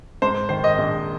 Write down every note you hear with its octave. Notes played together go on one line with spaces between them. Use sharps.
G#2 C5
D#3 C5
D#5
A#1